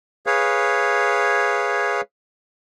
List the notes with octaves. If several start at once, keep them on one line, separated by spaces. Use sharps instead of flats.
G#4 B4 C#5 F5